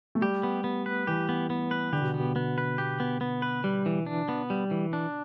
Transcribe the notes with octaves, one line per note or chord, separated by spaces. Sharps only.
A3
G3 G4
B3
B3
B4
E3 G4
B3
B3
B4
D3 G4
B2
B3
B2
B3
B4
G4
B3
B3
B4
G3
E3
D4
B3
G3
E3
D4